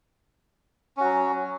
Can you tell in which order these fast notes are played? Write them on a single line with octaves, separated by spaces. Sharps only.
C#4 F#4 F#3